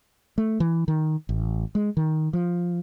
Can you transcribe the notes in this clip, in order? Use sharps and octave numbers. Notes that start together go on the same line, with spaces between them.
A3
E3
D#3
A1
G#3
D#3
F3